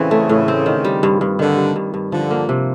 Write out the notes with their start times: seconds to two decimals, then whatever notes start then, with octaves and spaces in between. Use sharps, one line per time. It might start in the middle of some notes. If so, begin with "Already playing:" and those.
Already playing: A2 C#3 E3 C4
0.11 A3
0.29 A2
0.48 C4
0.66 D#3
0.85 G3
1.03 G2
1.21 G2
1.39 D3 D#3
1.58 G3
1.76 G2
1.94 G2
2.12 D3 F3
2.31 A#3
2.49 C3